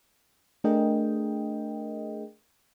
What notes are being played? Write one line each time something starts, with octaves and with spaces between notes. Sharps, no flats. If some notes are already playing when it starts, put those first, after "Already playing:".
A3 D4 G#4 A#4 D#5 G5